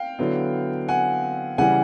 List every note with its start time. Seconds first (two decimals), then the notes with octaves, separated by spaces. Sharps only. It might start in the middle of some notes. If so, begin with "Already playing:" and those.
Already playing: F5 G5
0.19 D3 F#3 B3 E4
0.88 F#5 G#5
1.58 C#3 E3 G3 F#5 G#5